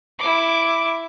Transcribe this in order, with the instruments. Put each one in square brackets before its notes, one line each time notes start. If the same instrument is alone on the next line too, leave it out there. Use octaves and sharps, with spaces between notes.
[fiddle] E4 D6